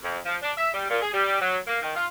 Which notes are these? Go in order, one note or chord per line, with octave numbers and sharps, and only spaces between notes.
F2
F3
D4
E5
G3
A#2
G#4
G3
F#3
A#3
D#3
F4